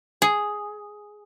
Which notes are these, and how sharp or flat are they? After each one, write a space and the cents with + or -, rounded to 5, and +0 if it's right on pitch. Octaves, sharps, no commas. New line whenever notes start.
G#4 +0